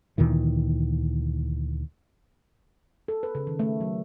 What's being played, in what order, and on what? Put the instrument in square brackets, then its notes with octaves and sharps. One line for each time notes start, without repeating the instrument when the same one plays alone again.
[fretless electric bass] D2 A#2 D#3 E3
[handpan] A4
B4
C#3
D#3
A3
F#3